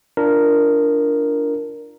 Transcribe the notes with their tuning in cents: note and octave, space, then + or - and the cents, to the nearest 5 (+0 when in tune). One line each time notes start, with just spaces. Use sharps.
D4 +0 F4 -25 A#4 +0